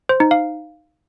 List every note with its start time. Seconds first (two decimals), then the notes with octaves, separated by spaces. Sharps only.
0.09 C5
0.20 D#4
0.31 F5